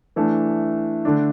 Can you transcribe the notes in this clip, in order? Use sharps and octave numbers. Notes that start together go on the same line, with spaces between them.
E3 A3 D4
D3 A3 D4